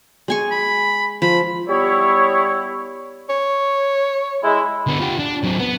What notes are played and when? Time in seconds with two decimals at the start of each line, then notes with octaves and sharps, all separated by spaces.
0.28 G#3 G#5 C#6
0.51 B5
1.22 F3 B5
1.68 G3 B3 E4 C#5
3.29 C#5
4.44 G#3 E4
4.87 D3 B3
5.00 F4 G4
5.19 D4
5.44 F#3 C4
5.59 B3